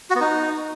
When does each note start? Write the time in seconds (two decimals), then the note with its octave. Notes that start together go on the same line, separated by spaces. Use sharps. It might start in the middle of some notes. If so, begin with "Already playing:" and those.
0.10 F#4
0.15 B3
0.21 D#4